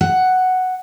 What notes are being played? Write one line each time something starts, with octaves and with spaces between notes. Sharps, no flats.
F#5